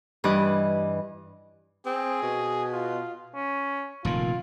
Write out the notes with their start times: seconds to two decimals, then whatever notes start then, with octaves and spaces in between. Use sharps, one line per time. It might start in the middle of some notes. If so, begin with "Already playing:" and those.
0.24 G2 E3 D#5 D6 F#6
1.86 C4 G#4
2.22 B2
2.73 F4
3.34 C#4
4.05 F1 A#2 D#3 F4